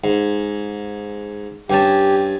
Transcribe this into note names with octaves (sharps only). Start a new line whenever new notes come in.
G#2
G2 C#4 G4 A5